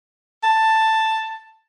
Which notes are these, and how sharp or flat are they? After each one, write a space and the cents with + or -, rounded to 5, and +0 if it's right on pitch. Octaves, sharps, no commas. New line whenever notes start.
A5 +5